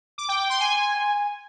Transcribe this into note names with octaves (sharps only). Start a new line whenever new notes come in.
D6
G5
G5
C6
G#5